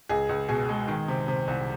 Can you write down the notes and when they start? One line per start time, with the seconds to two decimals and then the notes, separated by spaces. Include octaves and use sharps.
0.09 C#2 G#4
0.29 C#2
0.49 B2 G#4
0.69 G#3
0.88 D#3
1.08 C3
1.28 C3
1.48 C2